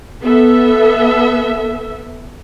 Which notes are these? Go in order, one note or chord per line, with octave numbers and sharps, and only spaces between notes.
B3 A4 E5